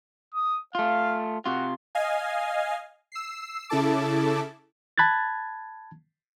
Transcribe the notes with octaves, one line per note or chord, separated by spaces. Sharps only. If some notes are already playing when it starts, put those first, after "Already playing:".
D#6
A3 F4 F5
C3 F4 F#4
D#5 F5 G#5
E6 C7
C#3 E4 A4 A5 D6
A5 B5 F#6 G#6 A6